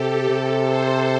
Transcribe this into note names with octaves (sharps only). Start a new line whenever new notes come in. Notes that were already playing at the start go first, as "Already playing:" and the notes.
Already playing: C3 G4 A4
C3 A4
C5